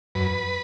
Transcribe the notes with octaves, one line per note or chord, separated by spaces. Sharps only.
F#2 B4